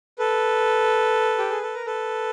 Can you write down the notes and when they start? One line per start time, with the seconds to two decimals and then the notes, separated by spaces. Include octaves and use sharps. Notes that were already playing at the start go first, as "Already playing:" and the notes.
0.19 A4 B4
1.38 G4
1.50 G#4
1.63 A4
1.74 A#4
1.86 A4 B4